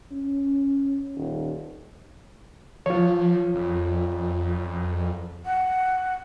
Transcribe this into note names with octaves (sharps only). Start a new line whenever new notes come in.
C#4
D#1
F3 F4 C#5
F2
F#5